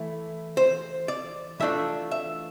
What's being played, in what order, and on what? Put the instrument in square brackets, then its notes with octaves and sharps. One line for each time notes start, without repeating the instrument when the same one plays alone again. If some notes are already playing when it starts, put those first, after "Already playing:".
Already playing: [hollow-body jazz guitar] E3 A3 E4
C5
D5
E3 A3 D4 F4 E5
E5